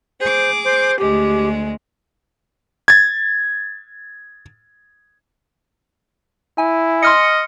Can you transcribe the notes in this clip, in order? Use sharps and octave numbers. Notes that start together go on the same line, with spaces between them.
G#4 C5 D6
C5
D2 G#3 G4
G#6 A6
E4 G#5
D#5 C6 F6 C#7